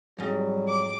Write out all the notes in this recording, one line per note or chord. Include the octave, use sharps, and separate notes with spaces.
F2 G#2 F#3 G3
D6